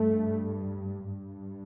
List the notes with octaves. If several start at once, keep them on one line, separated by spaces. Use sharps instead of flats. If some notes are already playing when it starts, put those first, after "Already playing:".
Already playing: G2 A3
G2